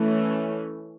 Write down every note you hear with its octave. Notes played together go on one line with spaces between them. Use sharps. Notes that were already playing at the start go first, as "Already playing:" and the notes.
Already playing: E3 A3 C#4